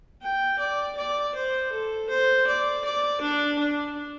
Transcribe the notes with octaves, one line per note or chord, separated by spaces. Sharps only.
G5
D5
D5
C5
A4
C5
D5
D5
D4
D4